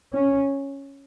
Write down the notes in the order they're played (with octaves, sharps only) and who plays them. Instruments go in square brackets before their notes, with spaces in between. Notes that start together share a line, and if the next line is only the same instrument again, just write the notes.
[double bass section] C#4